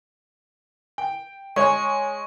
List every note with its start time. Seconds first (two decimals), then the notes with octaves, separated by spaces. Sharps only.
0.98 G5
1.56 G#3 C#5 C#6